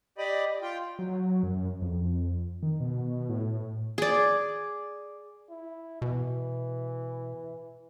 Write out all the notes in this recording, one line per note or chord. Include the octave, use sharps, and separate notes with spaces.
G4 D5 D#5 B5
F4 G5
F#3
F#2
F2
D#3
B2
A2
G#4 D5
E4
B2 E3